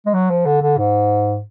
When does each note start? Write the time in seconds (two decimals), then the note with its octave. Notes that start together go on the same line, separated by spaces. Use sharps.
0.06 G#3
0.14 F#3
0.30 F3
0.46 D3
0.62 D3
0.78 G#2